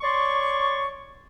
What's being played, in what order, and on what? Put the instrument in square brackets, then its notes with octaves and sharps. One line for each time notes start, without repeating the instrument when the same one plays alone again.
[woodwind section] C#5 D5 C6 C#6